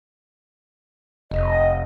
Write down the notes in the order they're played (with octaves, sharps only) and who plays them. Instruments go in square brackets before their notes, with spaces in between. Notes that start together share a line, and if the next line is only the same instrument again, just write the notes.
[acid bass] F1 [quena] D#5